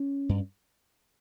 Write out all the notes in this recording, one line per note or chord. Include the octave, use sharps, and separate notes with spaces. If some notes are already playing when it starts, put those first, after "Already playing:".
Already playing: C#4
G2